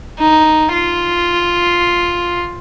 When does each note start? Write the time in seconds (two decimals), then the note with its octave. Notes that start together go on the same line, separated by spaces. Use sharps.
0.19 D#4
0.72 F4